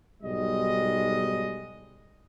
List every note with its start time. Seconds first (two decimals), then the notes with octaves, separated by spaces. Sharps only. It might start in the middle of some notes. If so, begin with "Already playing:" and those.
0.21 B1 G#2 G3 G#3 D#5